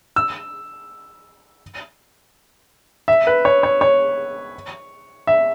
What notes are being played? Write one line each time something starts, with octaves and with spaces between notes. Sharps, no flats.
E6
E5
B4
C#5
C#5
C#5
E5